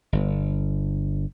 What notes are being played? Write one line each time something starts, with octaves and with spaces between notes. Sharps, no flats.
G1